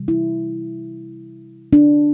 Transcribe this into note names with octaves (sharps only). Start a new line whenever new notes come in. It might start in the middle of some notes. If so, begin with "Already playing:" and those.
Already playing: C3 E3 G3
E4
D4